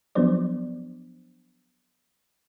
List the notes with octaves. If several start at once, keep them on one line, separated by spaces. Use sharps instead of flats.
F3 F#3 B3 D4 C5 D5